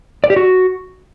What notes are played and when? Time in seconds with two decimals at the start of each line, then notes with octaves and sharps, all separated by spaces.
0.24 D5
0.30 G4
0.36 F#4